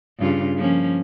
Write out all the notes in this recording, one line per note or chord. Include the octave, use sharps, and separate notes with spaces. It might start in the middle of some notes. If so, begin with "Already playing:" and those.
G2 C#3 F4
F3 A#3 C#4